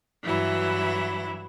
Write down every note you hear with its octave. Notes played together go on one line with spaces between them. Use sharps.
G2 E3 F#3 E4